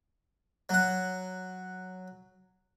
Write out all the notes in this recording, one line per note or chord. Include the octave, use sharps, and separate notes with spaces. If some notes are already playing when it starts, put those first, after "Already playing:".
F#3 F#5